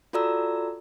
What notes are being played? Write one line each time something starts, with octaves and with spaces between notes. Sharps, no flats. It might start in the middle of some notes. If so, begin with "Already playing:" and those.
F4 F#4 A4 D5 A#5 E6